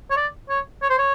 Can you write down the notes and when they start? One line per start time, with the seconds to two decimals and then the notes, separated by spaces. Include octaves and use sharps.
0.10 C#5
0.16 D5
0.49 C#5
0.82 C#5
0.89 C5
0.98 C#5